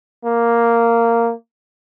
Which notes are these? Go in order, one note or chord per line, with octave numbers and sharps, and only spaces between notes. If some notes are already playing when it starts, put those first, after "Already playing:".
A#3